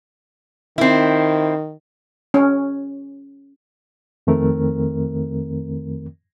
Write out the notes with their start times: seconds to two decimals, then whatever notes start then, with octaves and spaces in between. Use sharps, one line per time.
0.78 D#3 C4 E4
2.34 C#4
4.27 F2 D#3 A3 C4 A#4